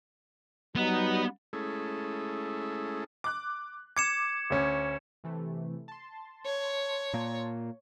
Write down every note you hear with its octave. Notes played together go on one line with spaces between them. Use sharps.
F#3 G3 B3 D#4
G#3 A3 C#4 E4 G#4 A4
D6 F#6
D6 G#6 C#7 E7
D2 C#4
C3 E3 A3
A5 C6
C#5
A#2 A#3